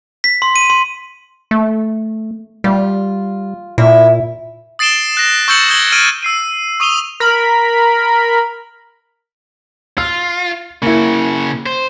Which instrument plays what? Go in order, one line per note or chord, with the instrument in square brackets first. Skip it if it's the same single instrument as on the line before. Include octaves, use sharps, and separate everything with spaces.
[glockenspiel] B6
C6
D#7
C6
[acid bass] A3
[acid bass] G3 [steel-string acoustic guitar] F4
[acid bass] A#2 [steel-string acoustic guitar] E4
[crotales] D#6 A6 C7 D7 E7 G7
F#6 A#6 E7
C#6 E6 G6 A6 C#7 F#7
D#6 G6 G#6 G7
F6 F#6 G#6 D7 D#7
E6 C7 D#7
C#6 D#6 D#7 F7 G7
[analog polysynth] A#4 B5
[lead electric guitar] F4 [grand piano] F6
[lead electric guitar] C#3 F#4 [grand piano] A#3 E4
[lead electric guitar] C5